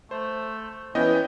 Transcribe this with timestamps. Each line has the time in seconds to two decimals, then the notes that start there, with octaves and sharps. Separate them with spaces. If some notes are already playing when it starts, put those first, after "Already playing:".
0.11 A3 C5
0.95 E3 B3 C#4 D#5 G5